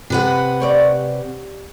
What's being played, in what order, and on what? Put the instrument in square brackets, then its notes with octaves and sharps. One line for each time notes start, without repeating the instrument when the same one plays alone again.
[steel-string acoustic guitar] C3 B4 F#5
[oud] G4 C#5 D5